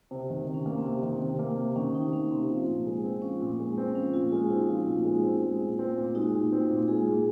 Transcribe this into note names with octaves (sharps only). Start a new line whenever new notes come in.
C3
D#3
C3
C#4
A#3
C4
C3
D#3
C3
A#3
C3
D#3 C#4
C3 D#4
A#3 C#4
C3 C4
F3
A#2
G#3
C4
F3 C#4
A#2
G#3
C4
F3 C#4
A#2 F4
G#3 F4
C4 D#4 F#4
F3 F4
A#2
G#3
C4
G#3
A#2
C4
A#2
G#3 D#4 F#4
A#2
C4
A#2
G#3 F4 G#4
A#2